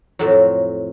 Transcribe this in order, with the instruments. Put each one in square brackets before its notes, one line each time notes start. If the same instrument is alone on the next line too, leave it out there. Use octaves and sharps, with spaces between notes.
[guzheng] F2 A2 F#3